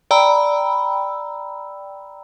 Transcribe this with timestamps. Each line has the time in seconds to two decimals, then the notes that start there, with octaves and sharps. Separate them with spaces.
0.11 D5 G5 A#5 B5 E6